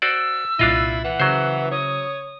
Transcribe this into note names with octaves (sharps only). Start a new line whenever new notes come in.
F#4 C5 D5 E6
C2 A#2 D4 E4 F4 D#5
E3 F#5
C#3 F#3 C5
C#5 D#6